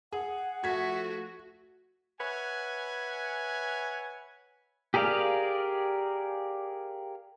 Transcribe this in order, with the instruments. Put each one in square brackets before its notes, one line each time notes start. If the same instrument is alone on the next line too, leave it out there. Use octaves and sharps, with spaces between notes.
[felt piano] G#4 [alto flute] F#5
[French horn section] F3 A3 [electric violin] F#4 [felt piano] G#6 B6
[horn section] B4 C#5 E5 F#5 G#5
[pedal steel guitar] G4 G#4 A#4 D5 F5